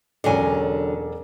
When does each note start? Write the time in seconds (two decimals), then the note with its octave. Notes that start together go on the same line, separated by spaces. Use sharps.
0.24 E1 D3 F#3 C#4 D5 G#5